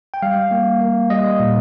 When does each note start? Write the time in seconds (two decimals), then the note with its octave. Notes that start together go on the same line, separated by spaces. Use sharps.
0.14 G5
0.22 G3 F5
0.51 A#3
0.81 A#3
1.10 G3 D#5
1.40 A#2